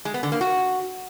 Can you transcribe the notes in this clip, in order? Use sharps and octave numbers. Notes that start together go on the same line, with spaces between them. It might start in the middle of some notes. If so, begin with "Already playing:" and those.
G#3
B3
D3
A#3
F#4